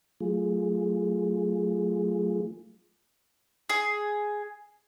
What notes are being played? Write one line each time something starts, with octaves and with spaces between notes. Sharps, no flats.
F#3 A3 F4 G#4
G#4